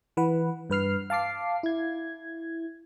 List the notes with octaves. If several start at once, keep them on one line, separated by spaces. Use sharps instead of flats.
E3 B4 F#5
G2 B4 F6 C7
F5 A5 D6 C7
E4 G#6